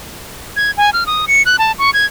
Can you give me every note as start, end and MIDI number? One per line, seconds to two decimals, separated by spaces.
0.56 0.71 92
0.77 0.90 80
0.93 1.06 89
1.07 1.25 87
1.28 1.43 97
1.46 1.57 90
1.59 1.72 81
1.79 1.90 85
1.94 2.06 92